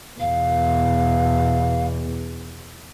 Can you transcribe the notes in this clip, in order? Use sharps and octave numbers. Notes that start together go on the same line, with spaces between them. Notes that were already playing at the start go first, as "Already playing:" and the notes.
E2 B2 F5